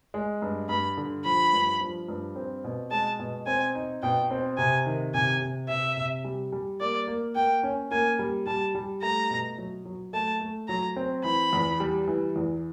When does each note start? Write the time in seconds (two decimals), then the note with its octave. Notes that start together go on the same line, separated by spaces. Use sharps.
0.14 G#3
0.42 G2
0.69 G2 B5
0.97 D3
1.24 F3 B5
1.53 G2
1.81 F3
2.08 G2
2.36 C4
2.64 B2
2.91 G#3 A5
3.19 B2
3.47 C4 G#5
3.75 D#4
4.02 B2 G5
4.31 C4
4.58 C3 G#5
4.86 D#3
5.14 C3 G#5
5.41 C3
5.69 C3 E5
5.97 C3
6.24 G3
6.52 G3
6.81 A#3 D5
7.08 A#3
7.35 A#3 G5
7.63 C#4
7.91 A#3 G#5
8.19 G3
8.47 G3 A5
8.75 G3
9.02 A3 A#5
9.30 B2
9.58 F#3
9.85 F#3
10.13 A3 A5
10.41 A3
10.68 F#3 A#5
10.96 C4
11.24 E3 B5
11.53 E2
11.80 G3
12.08 E3
12.36 E2